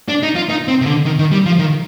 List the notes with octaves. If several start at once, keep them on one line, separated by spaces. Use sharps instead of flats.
D4
D#4
F4
D#4
C4
C3
D3
D#3
D#3
G3
F3
D#3